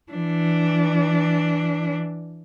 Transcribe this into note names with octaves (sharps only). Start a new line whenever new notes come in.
E3 D4